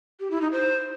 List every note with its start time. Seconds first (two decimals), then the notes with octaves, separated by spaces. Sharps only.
0.20 G4
0.31 E4
0.41 D#4
0.52 C5